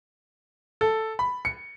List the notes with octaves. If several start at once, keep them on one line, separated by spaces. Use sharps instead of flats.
A4
B5
C#7